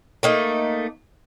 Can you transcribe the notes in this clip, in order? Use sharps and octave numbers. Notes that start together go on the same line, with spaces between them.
A3 A#3 D#4